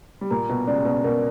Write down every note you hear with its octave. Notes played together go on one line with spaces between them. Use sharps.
G3
A#2 A#3 A#5
B2
C#2 C#3 D5
B2
B2 A#4